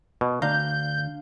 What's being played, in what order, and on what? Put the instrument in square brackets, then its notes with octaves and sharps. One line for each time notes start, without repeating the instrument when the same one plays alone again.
[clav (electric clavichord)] B2
[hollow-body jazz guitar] D2 [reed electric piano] D4 F5 [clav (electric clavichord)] A#5 [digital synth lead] G6